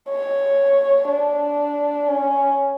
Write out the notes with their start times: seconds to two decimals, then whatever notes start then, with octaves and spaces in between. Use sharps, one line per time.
0.10 C#5
1.09 D4
2.08 C#4